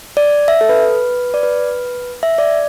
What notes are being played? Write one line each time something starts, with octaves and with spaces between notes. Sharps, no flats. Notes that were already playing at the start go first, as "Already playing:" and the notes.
D5
E5
A4
B4
D5
B4
E5
D5